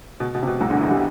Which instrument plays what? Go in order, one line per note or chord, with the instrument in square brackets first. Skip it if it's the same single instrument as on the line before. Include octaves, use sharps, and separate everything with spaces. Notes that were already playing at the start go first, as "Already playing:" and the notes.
[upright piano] B2
B2
C3
B2
C2 C3
D2 D3
E2 E3
G3